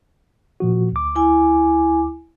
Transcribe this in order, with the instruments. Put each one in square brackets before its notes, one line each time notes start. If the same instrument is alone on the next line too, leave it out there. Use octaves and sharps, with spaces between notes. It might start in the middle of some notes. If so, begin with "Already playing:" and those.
[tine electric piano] A#2 F3 F#4
D2 D6
[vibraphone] E4 G#5